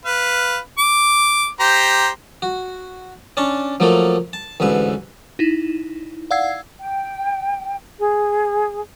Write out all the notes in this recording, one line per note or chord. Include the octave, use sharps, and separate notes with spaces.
B4 F5
D6
G4 C5 A#5
F#4
C#4 D4 A5 C#6
F3 F#3 A3 A#3 A4
A5
A1 D2 G#2 B4 E5
D#4 E4
D5 F5 F#5 E6 G#6 C7
G5
G#4